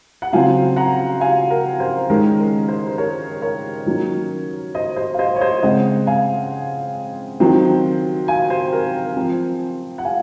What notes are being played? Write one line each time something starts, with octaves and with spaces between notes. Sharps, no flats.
F#5
C#3 F#3 C4 F5 G#5
F#5 A#5
F5 G#5
A#4
C5
D#3 G#3 C#4 A#4
A#4
C5
C5
A#4 C#5
A#4 C#5
D#3 F#3 A#3 C#4
C5 D#5
C5 D#5
F5
C5 D#5
C#5
C5 D#5
C#3 G#3 C4 D#5 F#5
F5 G#5
D#3 F#3 C4
F5 G#5
C5
A#4
F3 C4
F#5
F5 G#5